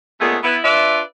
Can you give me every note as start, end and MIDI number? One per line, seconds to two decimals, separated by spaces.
0.20 0.37 46
0.20 0.37 49
0.20 0.37 56
0.20 0.37 57
0.20 0.37 59
0.20 0.37 68
0.43 0.57 59
0.43 0.57 64
0.63 1.01 62
0.63 1.01 65
0.63 1.01 71
0.63 1.01 74
0.63 1.01 76